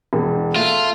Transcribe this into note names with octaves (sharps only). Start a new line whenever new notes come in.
E1
A3 F4